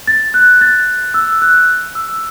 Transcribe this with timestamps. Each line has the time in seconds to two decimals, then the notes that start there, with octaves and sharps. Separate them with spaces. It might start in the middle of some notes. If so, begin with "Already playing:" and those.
0.07 A6
0.34 F#6
0.61 A6
1.14 E6
1.42 F#6
1.95 E6